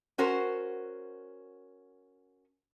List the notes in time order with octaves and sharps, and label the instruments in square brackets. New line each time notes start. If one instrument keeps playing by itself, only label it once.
[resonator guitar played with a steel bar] C#4 F#4 A#4 C5